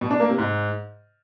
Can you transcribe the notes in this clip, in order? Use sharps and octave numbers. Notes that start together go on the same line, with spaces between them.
B2
D4
A#3
C3
G#2